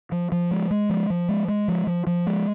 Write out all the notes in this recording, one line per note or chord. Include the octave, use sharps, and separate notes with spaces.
F3
F3
G#3
G#3
F3
F3
G#3
G#3
F3
F3
F3
G#3